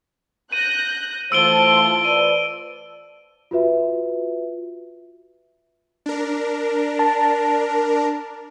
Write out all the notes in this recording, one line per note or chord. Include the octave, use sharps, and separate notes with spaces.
F#6 G6 A#6 D#7
E3 A3 F4 C5 A5 E6 D7 G7
B4 D5 D#7
F4 F#4 B4 E5
D4 A#4
A5